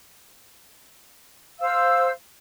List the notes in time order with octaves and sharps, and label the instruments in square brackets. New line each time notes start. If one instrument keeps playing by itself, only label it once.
[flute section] C5 F5 E6